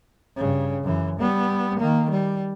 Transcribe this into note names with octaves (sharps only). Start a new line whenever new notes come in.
G2 C#3
F#2 E3
G3 B3
D#3 A#3
G3